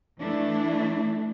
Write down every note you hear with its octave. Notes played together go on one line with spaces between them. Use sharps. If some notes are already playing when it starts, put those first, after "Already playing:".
E3 A3 D4 E4